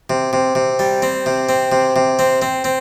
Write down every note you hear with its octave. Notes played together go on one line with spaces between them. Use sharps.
C3
C3
C3
G3
C4
C3
C4
C3
C3
C4
C4
C4